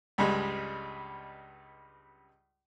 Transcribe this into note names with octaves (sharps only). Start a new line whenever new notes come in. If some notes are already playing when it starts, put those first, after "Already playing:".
C#2 G2 G3 G#3